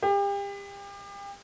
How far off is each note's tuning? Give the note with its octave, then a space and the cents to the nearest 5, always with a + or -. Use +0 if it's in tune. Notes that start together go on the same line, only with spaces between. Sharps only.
G4 +35